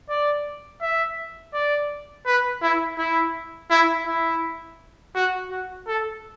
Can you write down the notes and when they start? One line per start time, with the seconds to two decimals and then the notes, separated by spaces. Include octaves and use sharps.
0.09 D5
0.81 E5
1.54 D5
2.26 B4
2.62 E4
2.98 E4
3.70 E4
4.07 E4
5.15 F#4
5.51 F#4
5.87 A4